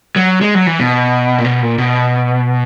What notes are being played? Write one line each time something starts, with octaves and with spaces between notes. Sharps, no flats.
F#3
G#3
F#3
E3
B2
A#2
B2
A#2
B2